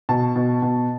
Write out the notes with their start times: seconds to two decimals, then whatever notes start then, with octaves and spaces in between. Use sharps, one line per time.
0.09 B2 A5
0.36 B2
0.62 B2